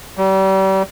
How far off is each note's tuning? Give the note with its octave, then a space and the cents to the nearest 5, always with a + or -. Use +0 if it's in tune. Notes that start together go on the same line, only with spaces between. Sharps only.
G3 -35